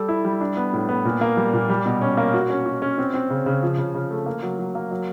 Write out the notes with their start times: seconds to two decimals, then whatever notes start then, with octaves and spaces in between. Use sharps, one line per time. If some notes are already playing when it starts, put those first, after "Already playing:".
Already playing: G3 A4
0.09 E4
0.25 G3
0.41 D4
0.57 B3
0.73 A2
0.89 B3
1.05 A#2
1.21 A#3
1.37 G3
1.53 A#2
1.69 G3
1.85 B2
2.01 C#4
2.17 A#3
2.34 F#4
2.50 C#4
2.66 F#4
2.82 C#4
2.98 C4
3.14 C4
3.30 C#3
3.46 C#3
3.62 F3
3.78 C#3
3.95 C#3
4.11 A3
4.26 A#3
4.43 F#3
4.59 F#3
4.75 A#3
4.91 F#3